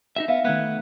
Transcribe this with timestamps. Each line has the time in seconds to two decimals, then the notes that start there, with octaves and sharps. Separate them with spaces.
0.16 D#4 G4 E5
0.28 B3 E5 F5
0.45 D#3 A3 B3 F#6 G#6